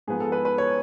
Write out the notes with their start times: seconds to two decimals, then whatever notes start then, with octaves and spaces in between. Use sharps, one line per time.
0.07 G#2 F3 B3 G#4
0.20 A4
0.32 B4
0.45 B4
0.58 C#5